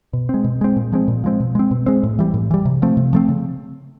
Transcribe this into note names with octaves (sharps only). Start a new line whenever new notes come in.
B2
G#3 C4
B2
G#3 C4
A#2
F3 G#3 C4
A#2
F3 G#3 C4
B2
G#3 C4
B2
G#3 C4
A2
E3 G3
A2
E3 G3
C3
F3 A3 C4
C3
F3 A3 C4
C#3